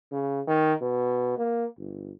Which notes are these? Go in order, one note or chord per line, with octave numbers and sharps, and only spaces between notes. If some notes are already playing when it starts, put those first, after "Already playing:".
C#3
D#3
B2
A#3
G1